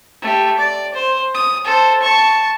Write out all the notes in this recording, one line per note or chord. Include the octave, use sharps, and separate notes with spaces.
A3 G4
D5
C5
D#6
A4 C5
A5 C#6